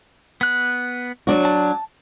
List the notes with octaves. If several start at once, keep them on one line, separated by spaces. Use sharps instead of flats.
B3 F#6
F#3 D4 F#4
A5